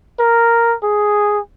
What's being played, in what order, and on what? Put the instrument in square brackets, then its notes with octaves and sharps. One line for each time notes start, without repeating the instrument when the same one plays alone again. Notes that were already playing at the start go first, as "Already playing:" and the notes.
[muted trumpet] A#4
G#4